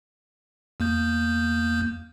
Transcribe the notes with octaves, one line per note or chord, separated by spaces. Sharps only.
E2 A#3 G6